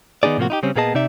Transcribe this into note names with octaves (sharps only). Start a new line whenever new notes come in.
D#3 B3 D#4 G#4 D5
A2 C3 F3 A#3 F#4
D#4 E4 G4
C#3 G3 C4 C#4
A#2 A#3 B3 G#4 D#5 A5
C3 D#4 D5 E5